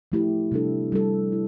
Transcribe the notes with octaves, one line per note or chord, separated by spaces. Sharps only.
F3 A3 E4 G4
C3 G3 D4 A4
G3 D4 A4
E4